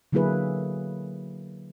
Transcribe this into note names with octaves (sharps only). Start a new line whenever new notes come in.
D3 F#3 A#3 E4 G#4 B4